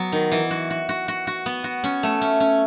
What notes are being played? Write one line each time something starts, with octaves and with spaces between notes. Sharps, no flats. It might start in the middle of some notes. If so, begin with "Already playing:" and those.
Already playing: F#3 B3
D#3
E3
F#4
F#4
F#4
F#4
F#4
B3
F#4
C#4
A3
C#4
C#4